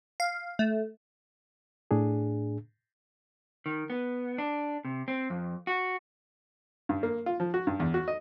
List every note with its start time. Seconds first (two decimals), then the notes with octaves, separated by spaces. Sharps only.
0.20 F5
0.59 A3
1.91 A2 D4 G#4
3.66 D#3
3.90 B3
4.38 D4
4.85 C3
5.08 C4
5.30 F2
5.67 F#4
6.89 G2
7.03 A#3
7.26 F4
7.40 F3
7.54 F#4
7.67 G2
7.80 E2
7.94 F#4
8.08 D#5